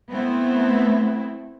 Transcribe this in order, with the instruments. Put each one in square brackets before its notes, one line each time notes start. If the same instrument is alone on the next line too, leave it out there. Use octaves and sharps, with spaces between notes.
[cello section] A3 B3 C4 E4